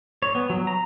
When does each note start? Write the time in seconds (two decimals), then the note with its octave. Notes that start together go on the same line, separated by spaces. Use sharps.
0.22 C#5
0.35 B3
0.50 F#3
0.67 A#5